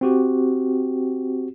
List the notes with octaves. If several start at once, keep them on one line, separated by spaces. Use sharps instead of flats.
C4 F#4 G4